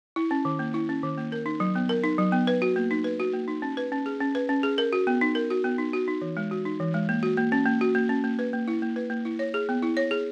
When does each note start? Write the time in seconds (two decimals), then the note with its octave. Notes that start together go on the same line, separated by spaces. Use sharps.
0.16 E4
0.31 C#4
0.45 D#3
0.59 A#3
0.74 E4
0.89 C#4
1.03 D#3
1.18 A#3
1.32 A#4
1.46 D#4
1.60 F#3
1.75 B3
1.89 A#4
2.04 D#4
2.18 F#3
2.32 B3
2.47 B4
2.62 F#4
2.76 A#3
2.91 D#4
3.04 B4
3.20 F#4
3.34 A#3
3.48 D#4
3.62 C#4
3.77 B4
3.92 C#4
4.06 G#4
4.20 C#4
4.35 B4
4.49 C#4
4.63 G#4
4.78 A#4
4.93 F#4
5.07 B3
5.21 D#4
5.35 A#4
5.50 F#4
5.64 B3
5.78 D#4
5.93 F#4
6.08 D#4
6.22 E3
6.37 G#3
6.51 F#4
6.65 D#4
6.80 E3
6.94 G#3
7.09 A#3
7.23 F#4
7.37 A#3
7.52 C#4
7.66 A#3
7.81 F#4
7.95 A#3
8.09 C#4
8.24 A#3
8.39 B4
8.53 A#3
8.68 E4
8.82 A#3
8.96 B4
9.10 A#3
9.25 E4
9.39 C#5
9.54 G#4
9.69 B3
9.82 E4
9.97 C#5
10.11 G#4